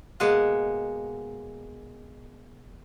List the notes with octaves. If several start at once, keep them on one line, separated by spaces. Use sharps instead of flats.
B2 G#3 A#3 G#4 F#5